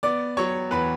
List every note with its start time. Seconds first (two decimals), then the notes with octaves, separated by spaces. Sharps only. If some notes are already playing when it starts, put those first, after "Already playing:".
0.03 B3 D5 D6
0.37 F#3 C#5 C#6
0.71 E2 B4 B5